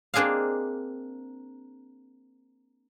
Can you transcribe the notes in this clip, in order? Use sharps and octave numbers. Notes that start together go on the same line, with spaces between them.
A#3 C4 D4 G#4 D#5 F5